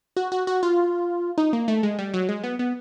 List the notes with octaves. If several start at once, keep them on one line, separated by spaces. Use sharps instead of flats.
F#4
F#4
F#4
F4
D#4
A#3
A3
G#3
G3
F#3
G#3
B3
B3